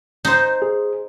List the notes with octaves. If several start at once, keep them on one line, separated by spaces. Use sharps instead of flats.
D#4 C5
G#4